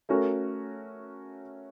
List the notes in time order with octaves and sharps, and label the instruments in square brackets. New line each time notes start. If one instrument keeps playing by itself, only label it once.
[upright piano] A3 C#4 F#4 A#4